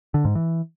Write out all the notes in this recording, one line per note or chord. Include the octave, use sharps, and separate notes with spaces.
D3
G#2
E3